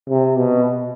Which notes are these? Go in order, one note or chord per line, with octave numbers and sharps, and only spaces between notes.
C3
B2